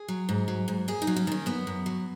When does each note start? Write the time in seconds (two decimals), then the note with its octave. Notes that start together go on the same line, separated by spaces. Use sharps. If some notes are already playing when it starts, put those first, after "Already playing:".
Already playing: G#4
0.08 F#3
0.29 G#2
0.48 F#3
0.68 G#2
0.88 F#2 G#4
1.02 D#4
1.07 F#3
1.16 C#4
1.27 D#3 C#4
1.46 F#2 B3
1.67 F#2
1.86 F#3